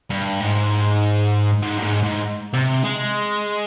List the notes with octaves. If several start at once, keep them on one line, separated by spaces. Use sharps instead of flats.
G2
G#2
G#2
G2
G#2
G#2
C3
G#3